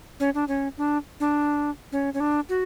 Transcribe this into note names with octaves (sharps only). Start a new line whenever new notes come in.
C#4
D4
C#4
D4
D4
C#4
C#4
D4
F#4